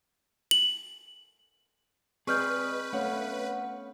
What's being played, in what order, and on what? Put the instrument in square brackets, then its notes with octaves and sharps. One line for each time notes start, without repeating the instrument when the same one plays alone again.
[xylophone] F#7
[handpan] C4 [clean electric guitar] G#4 D5 D#5 [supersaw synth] B4 [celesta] C#6 F6 G6
[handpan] A3 C#5 F5 [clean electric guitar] B3 C#4 F#5